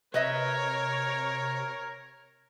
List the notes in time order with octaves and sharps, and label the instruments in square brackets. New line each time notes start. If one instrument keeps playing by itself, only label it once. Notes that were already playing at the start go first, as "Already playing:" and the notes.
[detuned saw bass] C3 [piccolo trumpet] A#4 [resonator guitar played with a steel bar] B4 D#5 E5 [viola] C#5